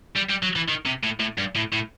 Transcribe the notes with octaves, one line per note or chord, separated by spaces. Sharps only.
G3
G3
F#3
E3
D#3
C3
A2
A2
G2
A2
A2